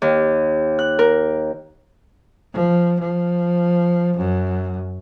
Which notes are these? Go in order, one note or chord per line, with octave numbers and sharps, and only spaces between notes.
D#2
F#6
A#4
F3
F3
F#2